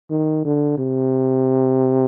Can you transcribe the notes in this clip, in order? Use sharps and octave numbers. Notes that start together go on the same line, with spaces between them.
D#3
D3
C3